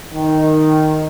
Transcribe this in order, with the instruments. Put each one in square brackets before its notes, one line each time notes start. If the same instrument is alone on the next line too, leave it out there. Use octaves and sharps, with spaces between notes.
[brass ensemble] D#3